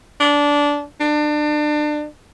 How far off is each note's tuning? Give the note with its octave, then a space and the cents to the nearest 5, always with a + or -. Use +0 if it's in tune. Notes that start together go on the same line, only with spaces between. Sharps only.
D4 -15
D4 +30